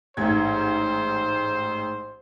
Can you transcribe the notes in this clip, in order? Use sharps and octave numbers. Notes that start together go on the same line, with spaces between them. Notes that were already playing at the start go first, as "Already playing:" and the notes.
A1 G#2 C5 G#6